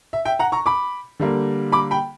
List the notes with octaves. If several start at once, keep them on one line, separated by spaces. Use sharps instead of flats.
E5
E5 G5
F#5 A#5
A#5 C#6
B5 D6
D3 G3 A#3
B5 D6
G5 B5